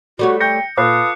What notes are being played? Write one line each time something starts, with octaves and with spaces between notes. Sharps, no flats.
G3 A3 F#4 C#5
G5 G6 A#6 C#7
A#2 F4 A4 B4 D6 D#6 F#6 C7